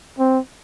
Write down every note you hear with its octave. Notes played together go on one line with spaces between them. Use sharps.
C4